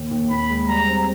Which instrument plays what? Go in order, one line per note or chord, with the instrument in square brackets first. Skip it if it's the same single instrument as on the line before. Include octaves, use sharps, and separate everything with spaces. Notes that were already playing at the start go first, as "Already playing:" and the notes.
Already playing: [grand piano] D#2
D#2
[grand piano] D#2 [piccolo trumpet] B5
[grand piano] G#3
[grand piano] G3 [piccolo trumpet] A#5
[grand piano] C4